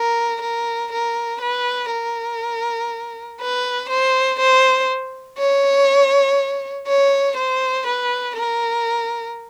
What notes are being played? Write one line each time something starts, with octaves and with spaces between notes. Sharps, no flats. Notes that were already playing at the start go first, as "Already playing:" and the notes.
Already playing: A#4
A#4
A#4
B4
A#4
B4
C5
C5
C#5
C#5
C5
B4
A#4